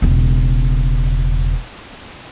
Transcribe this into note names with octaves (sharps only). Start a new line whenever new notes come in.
E1 C#3